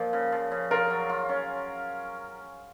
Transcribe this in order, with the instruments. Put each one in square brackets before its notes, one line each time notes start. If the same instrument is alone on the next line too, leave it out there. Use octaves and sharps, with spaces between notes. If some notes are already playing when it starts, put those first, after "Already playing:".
Already playing: [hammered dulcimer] A#2 F3
C#3
F3
C#3
[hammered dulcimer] F4 [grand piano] A#4
[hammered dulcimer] F#3
F4
C#4